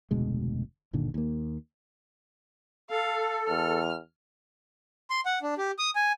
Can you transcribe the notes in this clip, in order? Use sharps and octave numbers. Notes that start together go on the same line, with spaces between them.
F1 D2 B2 G#3
F#1 A#2 D3 D#3
D#2 A#3
A4 F5
E2 F6
C6
F#5
D4
G4
D#6
G#5